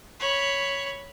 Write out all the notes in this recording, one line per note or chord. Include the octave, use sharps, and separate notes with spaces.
C#5 B5